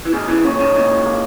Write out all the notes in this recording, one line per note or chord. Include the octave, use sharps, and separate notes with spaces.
E3
B2 D#3 G#4
C#3 E3
A#2 C#3 C#5
B2 D#3
A#2 C#3 D#4
A#3